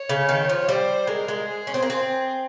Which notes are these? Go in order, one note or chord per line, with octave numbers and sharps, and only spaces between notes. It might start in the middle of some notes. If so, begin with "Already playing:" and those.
Already playing: C#5
C#3
D#3
F3
G3 C5
G#3 A#4
G#3
G#4
C#4
C4
A#3
C4